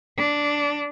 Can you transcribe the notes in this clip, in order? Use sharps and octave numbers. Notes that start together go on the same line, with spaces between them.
D4